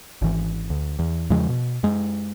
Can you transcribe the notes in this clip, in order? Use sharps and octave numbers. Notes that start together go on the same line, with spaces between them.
G#1 E3
D2
E2
E2 C#3 F3 G#3
B2
F#2 G#3